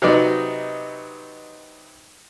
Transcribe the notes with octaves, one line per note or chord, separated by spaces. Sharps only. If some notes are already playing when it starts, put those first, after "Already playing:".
C3 F#3 B3 D#4 D5